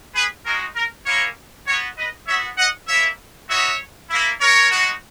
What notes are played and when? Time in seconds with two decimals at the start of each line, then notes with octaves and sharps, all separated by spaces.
0.15 G#4 B4
0.46 G#3 D#4 F#4 A#4
0.75 A#4
1.06 A#3 C#4 E4 A#4 C#5
1.67 B3 F#4 A#4 C#5
1.97 B4 D#5
2.28 B3 F#4 C#5 E5
2.58 D#5 F#5
2.88 A#3 E4 C#5 E5
3.49 B3 D#4 F#4 C#5 E5
4.10 A#3 E4
4.41 A#4 C#5
4.71 G#3 D#4 F#4